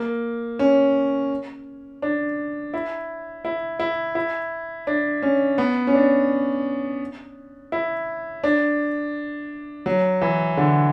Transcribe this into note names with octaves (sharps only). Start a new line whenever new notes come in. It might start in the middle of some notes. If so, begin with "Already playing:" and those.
Already playing: A#3
C#4
D4
E4
E4
E4
E4
D4
C#4
B3
C#4
D4
E4
D4
F#3
E3
D3